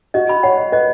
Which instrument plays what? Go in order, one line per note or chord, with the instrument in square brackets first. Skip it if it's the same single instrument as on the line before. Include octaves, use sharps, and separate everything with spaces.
[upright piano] F#4 [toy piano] D#5
[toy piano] B5
[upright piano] C#5 [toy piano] F#5
[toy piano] D#5
[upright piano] B4 [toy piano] D#5